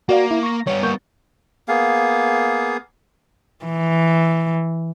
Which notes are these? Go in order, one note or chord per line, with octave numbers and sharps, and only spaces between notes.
A#3 F#4 D5 F5
E4
C#6 A#6
G3 B3 C#5
A#3 C#6 G6
A#3 B3 G#4 F5
E3